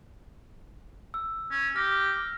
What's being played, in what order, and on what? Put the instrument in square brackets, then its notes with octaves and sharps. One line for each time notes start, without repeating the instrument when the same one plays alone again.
[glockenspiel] E6
[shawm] C#4
[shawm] G4 [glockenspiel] F6 A#6